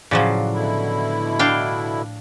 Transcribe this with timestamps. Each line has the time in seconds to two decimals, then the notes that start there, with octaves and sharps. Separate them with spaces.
0.11 A2 C#3 F3 F#3 D5
0.54 B2 D3 E4
1.39 D4 F5 G5